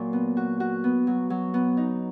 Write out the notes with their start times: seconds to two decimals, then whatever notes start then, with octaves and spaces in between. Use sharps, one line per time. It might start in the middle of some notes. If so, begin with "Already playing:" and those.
Already playing: A#2 F#3
0.13 B3
0.37 F#4
0.60 F#4
0.84 B3
1.07 F#3
1.30 F#3
1.54 B3
1.77 D#4